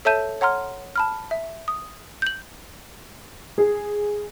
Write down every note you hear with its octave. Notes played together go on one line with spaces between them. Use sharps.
A4 C#5 E5 A5 G6 D#7
C#5 F#5 A#5 C6 F6
A5 B5 F6
E5
D#6
G6 F#7
G#4